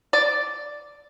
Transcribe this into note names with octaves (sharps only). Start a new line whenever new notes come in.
D5